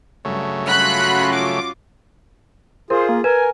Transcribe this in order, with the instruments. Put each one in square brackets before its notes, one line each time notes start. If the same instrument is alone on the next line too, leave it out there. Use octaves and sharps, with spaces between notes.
[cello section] G2 [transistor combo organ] C#3 F#3 A3
[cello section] C#4 F4 F#4 [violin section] B5 F#6
[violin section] D6
[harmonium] F4 G#4 [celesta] A#4 [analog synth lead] C5
[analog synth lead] A#3
[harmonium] A#4 [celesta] B4 [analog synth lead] G#5